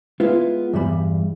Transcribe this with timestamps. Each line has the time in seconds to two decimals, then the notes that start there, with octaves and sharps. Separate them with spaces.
0.20 G#3 B3 E4 F4
0.73 E2 G2 G3 B5